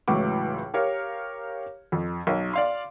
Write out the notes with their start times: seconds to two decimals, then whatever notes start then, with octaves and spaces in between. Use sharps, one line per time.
0.08 C#2 A2 E3 F#3 C#6 D6
0.74 G4 A#4 C#5 F5
1.92 F2
2.27 B1
2.53 D5 F5 C6